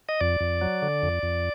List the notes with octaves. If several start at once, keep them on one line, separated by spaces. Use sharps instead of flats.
D#5
F2 D5
F2
F#3
D3
F2
F2